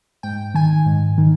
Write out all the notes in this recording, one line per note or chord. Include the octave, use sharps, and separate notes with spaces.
G#2 G5
D#3 G#5
G#2
D#3